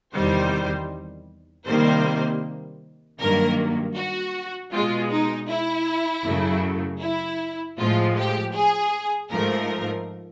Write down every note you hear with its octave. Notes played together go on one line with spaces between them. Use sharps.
E2 C3 D#3 G3 C5
C3 D#3 G3 A#3 C5
G2 D#3 F#3 A#3 A#4
F#4
B2 G#3 F4
D#4
E4
F#2 C#3 F#3 A3
E4
A2 F3 G#3 F4
G4
G#4
G#2 F3 A3 A#4